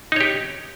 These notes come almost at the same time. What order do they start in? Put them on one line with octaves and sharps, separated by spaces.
D#4 C#5 G4